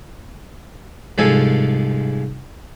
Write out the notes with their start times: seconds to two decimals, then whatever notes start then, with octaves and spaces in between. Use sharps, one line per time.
1.18 C2 G#2 F3 G#3 A4 G#5